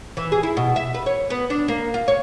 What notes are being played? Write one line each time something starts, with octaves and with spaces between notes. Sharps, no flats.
E3
G#4
E4
B2
E5
B4
C#5
B3
D4
A#3
F4
C#5